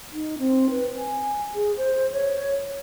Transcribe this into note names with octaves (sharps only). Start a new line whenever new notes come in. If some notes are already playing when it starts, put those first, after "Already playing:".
D#4
C4
B4
G#5
G#4
C5
C#5